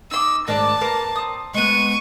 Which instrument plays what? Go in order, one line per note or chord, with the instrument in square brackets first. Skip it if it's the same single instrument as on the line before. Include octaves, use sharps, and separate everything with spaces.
[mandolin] D#4 C6 D6 [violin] E6
[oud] G#2 D#3 D4 [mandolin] A#4 D5 [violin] A5
[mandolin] A#3 A#5 [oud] A#4 B4
[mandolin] C4 D#6
[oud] G#3 B3 [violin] C#6 D#7